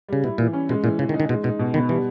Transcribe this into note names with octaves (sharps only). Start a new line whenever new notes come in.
C#3 G3
B2 E4
A#2 E3
C#4
B2 G#3
A#2 E3
C#3 E3
D#3
D#4
D#3
B2 G#3
B2 D#4
B2
D#3 B3
E3 G3